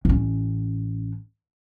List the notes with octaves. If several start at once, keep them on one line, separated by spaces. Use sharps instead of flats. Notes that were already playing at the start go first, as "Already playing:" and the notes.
A1 C#4